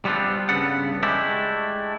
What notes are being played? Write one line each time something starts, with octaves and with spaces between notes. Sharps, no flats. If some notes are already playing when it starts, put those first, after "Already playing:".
G3 B3 C4 D4 F4
G2 C#3 B3 A4 F#5
G#3 A3 D4 E4 G4